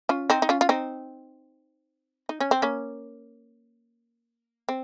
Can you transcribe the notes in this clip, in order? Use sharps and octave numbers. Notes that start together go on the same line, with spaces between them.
C#4 F4
C4 D#4
D#4
C#4 F4
F4
C4 D#4
D#4
C#4
C4
A#3 C#4
C4